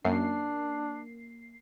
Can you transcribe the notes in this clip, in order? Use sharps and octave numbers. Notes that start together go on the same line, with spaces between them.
F#2 A#3 D4 C7